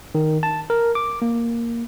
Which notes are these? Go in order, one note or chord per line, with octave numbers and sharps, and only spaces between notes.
D#3
A5
A#4
D6
A#3